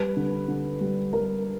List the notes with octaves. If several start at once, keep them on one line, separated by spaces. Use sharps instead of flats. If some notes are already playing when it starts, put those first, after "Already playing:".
Already playing: G3 B4
D3
D3
G3
G3 A#4